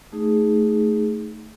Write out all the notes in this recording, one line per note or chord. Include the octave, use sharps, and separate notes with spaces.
A3 D#4 G#4